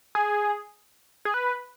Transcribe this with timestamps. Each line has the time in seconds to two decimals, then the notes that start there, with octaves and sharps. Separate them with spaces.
0.15 G#4
1.25 G#4
1.34 B4